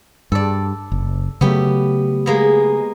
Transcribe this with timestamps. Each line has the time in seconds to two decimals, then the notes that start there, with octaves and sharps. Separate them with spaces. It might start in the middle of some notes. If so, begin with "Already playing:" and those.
0.32 G2 A4 D5
0.92 F#1
1.41 C#3 F#3 A3 B3 G4
2.26 G#3 A#3 B3